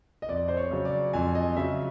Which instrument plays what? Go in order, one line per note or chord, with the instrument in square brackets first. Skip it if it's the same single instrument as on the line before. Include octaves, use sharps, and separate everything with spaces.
[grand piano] D#5
F2 D5
C5
C#5
C#3 F#3
D5
F2 G#5
D#5
C#3 F#3 E5